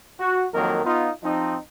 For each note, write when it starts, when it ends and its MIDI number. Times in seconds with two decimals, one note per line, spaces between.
0.20 0.45 66
0.53 0.81 41
0.53 0.81 51
0.53 0.81 54
0.53 0.81 58
0.53 0.81 70
0.84 1.08 59
0.84 1.08 63
0.84 1.08 65
1.23 1.57 53
1.23 1.57 60
1.23 1.57 63